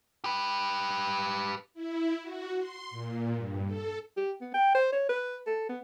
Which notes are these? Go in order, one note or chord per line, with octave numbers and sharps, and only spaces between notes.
G4 B4
E4
F#4
C6
A#2
G2
A4
G4
B3
G5
C5
C#5
B4
A4
B3